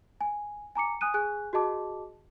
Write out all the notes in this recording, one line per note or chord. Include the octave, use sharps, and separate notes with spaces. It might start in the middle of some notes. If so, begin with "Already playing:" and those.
G#5
G#5 A#5 D6 C#7
G#5 D#6 F#6 D#7
G#4 G#5 F#6
F#4 G#4 D#5 A5 D6